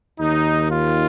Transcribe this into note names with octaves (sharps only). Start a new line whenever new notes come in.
D#2 D#3 D#4
F4